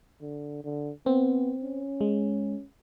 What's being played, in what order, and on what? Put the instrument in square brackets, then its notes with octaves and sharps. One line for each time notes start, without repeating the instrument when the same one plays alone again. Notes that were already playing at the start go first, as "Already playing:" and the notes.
[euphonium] D3
D3
[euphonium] B3 [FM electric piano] C4
[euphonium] C#4
[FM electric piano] G#3